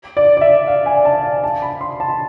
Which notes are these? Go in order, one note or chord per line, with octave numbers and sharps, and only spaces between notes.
D5
D5
E5
F5
G#5
A5
F5
A5
B5
C6
A5